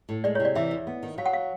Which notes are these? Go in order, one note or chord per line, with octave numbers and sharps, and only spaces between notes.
A2
G#3 D5
C#5
C3
D5
E3 E5
E2
B3
D#3
F#3 F5
F#5
F5